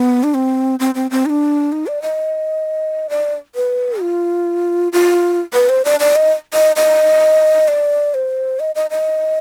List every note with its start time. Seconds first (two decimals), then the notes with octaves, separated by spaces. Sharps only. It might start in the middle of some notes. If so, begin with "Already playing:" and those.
Already playing: B3
0.23 D4
0.34 C4
0.80 C4
0.95 C4
1.11 C4
1.26 D#4
1.30 D4
1.72 D#4
1.87 D5
2.02 D#5
3.10 D5
3.55 B4
4.01 F4
4.93 F4
5.54 B4
5.69 C5
5.85 D5
6.00 D5
6.16 D#5
6.53 D#5
6.76 D#5
7.68 D5
8.14 C5
8.60 D#5
8.75 D#5
8.90 D#5